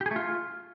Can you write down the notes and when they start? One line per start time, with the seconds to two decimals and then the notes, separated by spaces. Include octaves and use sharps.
0.01 G4
0.06 G#4
0.11 A3
0.16 F4